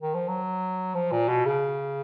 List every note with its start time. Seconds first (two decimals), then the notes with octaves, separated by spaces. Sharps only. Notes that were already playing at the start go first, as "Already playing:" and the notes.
0.02 D#3
0.14 F3
0.28 F#3
0.95 F3
1.12 A#2
1.29 B2
1.45 C#3